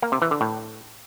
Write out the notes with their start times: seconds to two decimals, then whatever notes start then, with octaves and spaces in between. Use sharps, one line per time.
0.02 A#3
0.12 C3
0.22 E3
0.31 D3
0.41 A2